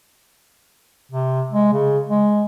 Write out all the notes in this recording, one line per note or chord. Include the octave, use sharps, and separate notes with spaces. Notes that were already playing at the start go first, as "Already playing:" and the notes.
C3
G#3
C#3
G#3